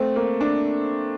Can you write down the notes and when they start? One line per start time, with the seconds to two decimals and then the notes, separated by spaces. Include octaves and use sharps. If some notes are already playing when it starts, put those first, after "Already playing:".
Already playing: A3 C4
0.16 A#3
0.41 D4